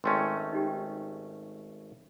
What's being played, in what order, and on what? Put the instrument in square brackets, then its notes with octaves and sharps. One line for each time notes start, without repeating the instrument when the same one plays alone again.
[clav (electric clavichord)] G#1 A3 C#4 [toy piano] G5 C6
[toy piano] D#4 G4 G5